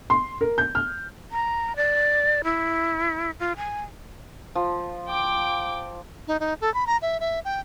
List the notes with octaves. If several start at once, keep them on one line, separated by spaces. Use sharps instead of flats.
C6
A#4
G6
F6
A#5
D5
E4
F4
G#5
F3
G5 D6
D#4
D#4
A4
B5
A#5
E5
E5
G5